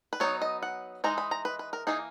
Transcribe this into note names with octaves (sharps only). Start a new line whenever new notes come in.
B4
F#3 B3 D#4 C#5
D#5
F#5
E3 G#3 D#4 A#5
B5
A#5
B4
B4
A#4
E3 A#3 D#4 G#4